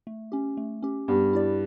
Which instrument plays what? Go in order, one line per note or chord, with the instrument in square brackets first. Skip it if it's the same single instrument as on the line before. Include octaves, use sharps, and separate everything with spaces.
[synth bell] A3
C#4 G4
A3
C#4 G4
[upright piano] G2 [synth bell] B3
[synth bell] E4 G4 D5